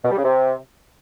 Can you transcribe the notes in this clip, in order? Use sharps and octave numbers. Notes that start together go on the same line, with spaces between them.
B2
G3
C#3
C3